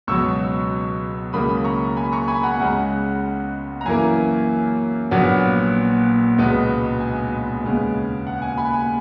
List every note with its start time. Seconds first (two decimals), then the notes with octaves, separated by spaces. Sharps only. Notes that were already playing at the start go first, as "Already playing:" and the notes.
0.07 C#2 B2 F#3 C#6 E6
1.33 C#2 C#3 F#3 A#3 B5 D#6
1.64 A#5 C#6
1.97 G#5 B5
2.12 A#5 C#6
2.28 G#5 B5
2.43 F#5 A#5
2.59 C#2 C#3 G#3 F#5
3.81 A#5
3.86 F#2 E3 A#3 G#5
5.11 A#1 A#2 F#3 B3 F#5
6.38 C#2 B2 G#3 B3
7.00 G#5
7.63 D#2 C#3 G#3 B3
8.27 F#5
8.42 G#5
8.57 G#5 B5
8.73 G#5